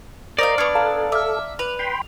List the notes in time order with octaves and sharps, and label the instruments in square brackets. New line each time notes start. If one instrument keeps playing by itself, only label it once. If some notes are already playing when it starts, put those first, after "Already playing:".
[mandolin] A#4 D#5 F5 [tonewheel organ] C5 [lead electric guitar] D5
[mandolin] B3 D4 [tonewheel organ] C#6 [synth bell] F6 G#6
[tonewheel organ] A4 [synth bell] F5 A5 A#5
[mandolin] E5 [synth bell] D6 F6
[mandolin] B4 [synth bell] F7
[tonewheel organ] G5 B5 C6